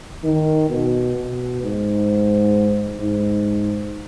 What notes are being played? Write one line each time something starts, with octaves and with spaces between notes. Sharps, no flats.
D#3
B2
B2
G#2
G#2